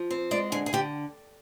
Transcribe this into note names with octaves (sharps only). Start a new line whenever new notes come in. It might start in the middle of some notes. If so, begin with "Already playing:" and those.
Already playing: F3
C4
G#3 D5
D3 G#4
G#4
D3 G4